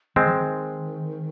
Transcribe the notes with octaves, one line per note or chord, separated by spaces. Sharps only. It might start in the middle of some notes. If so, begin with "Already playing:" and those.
D#3 G#3 C4
F3
D#3